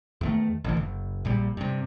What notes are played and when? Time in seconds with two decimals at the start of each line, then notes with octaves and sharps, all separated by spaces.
0.21 E2 D#3 A3
0.64 A1 D3 E3
0.77 F#1
1.25 A#1 A#2 G3
1.57 G2 C3